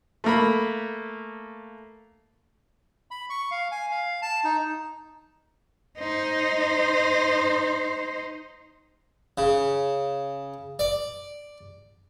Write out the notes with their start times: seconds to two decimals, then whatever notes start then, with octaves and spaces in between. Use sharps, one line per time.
0.24 A3 A#3 B5
3.11 B5
3.30 C#6
3.51 F5
3.72 G#5
3.91 F5
4.22 A5
4.44 D#4
5.99 D#4 C5
9.38 C#3
10.79 D5